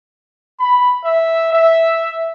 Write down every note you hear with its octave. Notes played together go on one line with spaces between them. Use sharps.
B5
E5
E5